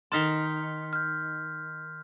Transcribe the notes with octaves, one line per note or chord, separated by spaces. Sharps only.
D#3 D#4 A5 C6 F6 B6
F6 G6